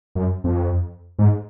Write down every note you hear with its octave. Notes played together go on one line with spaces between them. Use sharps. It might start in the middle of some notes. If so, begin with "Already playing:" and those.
F#2
F2
G#2